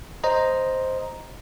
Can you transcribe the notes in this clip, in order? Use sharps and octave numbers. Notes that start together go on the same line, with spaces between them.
C5 D#5 A#5